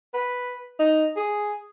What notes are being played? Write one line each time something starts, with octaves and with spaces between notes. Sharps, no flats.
B4
D#4
G#4